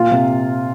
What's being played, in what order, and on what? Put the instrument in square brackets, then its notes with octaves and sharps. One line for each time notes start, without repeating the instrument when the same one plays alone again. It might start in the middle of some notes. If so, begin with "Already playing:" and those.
Already playing: [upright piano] A#2 [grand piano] F4
[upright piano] C3